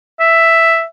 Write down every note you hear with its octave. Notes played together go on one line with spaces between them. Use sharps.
E5